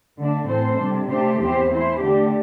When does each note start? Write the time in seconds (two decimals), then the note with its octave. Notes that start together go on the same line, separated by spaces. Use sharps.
0.18 D3 A3 D4
0.48 A2 E3 C4 A4 C5
0.78 C3 G3 D4
1.10 C3 A3 D4 G4 C5
1.40 E2 E3 C4 G4 C5
1.71 E3 A3 E4 C5
2.01 D3 A3 D4 G4